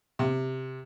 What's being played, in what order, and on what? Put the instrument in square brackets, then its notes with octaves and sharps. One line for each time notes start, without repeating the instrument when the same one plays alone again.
[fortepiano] C3